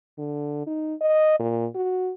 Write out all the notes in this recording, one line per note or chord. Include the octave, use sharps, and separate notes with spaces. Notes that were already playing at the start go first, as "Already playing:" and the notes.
D3
D#4
D#5
A#2
F#4